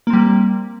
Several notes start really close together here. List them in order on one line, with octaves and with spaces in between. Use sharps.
A#3 C4 G3